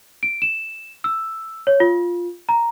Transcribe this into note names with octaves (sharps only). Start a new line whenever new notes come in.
D7
E7
E6
C#5
F4
A#5